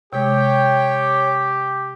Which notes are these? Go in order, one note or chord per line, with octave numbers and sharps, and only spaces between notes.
C3 G#3 G4 C#5 G5